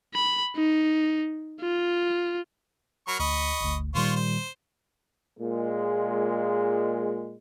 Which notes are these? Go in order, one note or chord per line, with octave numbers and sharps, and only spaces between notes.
B5
D#4
F4
F#3 A#4 B5 C#6
D2 D#5 B5 C#6
G1 D2
A#2 D#3 G3 F4 C5 C#6
C5
A#2 G#3